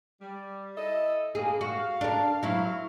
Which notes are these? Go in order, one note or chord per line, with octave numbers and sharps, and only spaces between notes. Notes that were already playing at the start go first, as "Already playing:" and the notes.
G3
E4 A4 D#5
G2 A#3 G#4
F#4 F5
D4 A#4
F#3 A3 E4 C5 F5